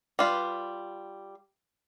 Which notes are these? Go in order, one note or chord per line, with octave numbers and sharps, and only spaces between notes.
G3 F4 B4